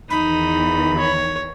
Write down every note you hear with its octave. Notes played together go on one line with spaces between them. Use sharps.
E2 D#3 E3 D#4 B5
C#5